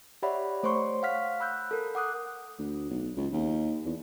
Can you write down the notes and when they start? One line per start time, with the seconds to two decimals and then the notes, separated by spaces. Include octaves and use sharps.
0.22 G4 C#5 D5 E5 F#5 B5
0.63 A3 C5 C#5 C6 C#6
1.03 F5 F#5 F6 B6
1.40 B5 E6 F#6 G6
1.71 A4 A#4
1.95 F#5 D6 D#6 F#6
2.59 D2
2.90 B1
3.17 C#2
3.33 D#2
3.85 E2